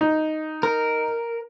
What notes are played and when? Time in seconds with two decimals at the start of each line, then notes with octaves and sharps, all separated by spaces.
0.01 D#4
0.63 A#4